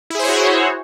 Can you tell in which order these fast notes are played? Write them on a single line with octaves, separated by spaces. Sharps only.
E4 G#4 C5 C#5 F#4